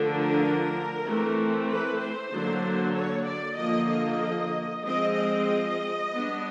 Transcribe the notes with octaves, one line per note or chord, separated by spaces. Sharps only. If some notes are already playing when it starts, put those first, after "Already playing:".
Already playing: D3 F3 A3 D4
A#4
E3 A3 C4
B4
C5
D3 F#3 A#3
C#5
D5
D3 F3 A#3 D#5
D#5
F3 G#3 C4 D#5
D#5
G3 B3 D4